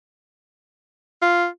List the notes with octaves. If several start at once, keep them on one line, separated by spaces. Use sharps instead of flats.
F4